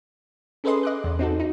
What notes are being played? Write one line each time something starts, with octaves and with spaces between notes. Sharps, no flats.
C#4 G#4 A4 B4 D#5 C6
D#5 D6 F#6
E2
C4 D#4 F#4 A4
D#4